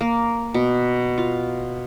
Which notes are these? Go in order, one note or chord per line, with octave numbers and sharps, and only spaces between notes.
A#3
B2
F4